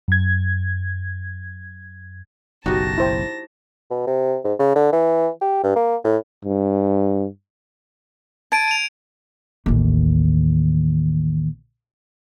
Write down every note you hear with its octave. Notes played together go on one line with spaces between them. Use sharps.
F#2 G#6
F#1 B1 D#4 F#4 G4 A5 A#6
E4 C5 G5
B2
C3
G#2
C#3
D3
E3
G4
G2
A#3
A2
G2
A5 G#6 D7 D#7
D#7 F7
A1 D#2